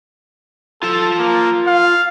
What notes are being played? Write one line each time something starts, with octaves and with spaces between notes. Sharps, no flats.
F4 A4 A5
A#3
F5